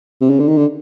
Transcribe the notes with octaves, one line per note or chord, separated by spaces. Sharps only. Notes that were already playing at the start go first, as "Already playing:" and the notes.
C3
C#3
D3
D#3
D3